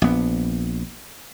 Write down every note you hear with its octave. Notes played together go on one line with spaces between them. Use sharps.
A#1 B3